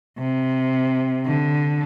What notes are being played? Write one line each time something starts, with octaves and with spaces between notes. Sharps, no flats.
C3
D3